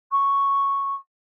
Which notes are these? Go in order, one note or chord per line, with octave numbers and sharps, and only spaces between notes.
C#6